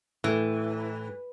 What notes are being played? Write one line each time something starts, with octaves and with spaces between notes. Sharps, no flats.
A2 E3 A3